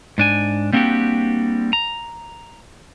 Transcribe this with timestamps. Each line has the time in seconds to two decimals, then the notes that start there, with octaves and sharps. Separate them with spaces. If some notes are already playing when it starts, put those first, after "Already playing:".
0.18 G#2 D4 G#5
0.73 G3 A#3 C4 D4 F#4 G4
1.73 A#5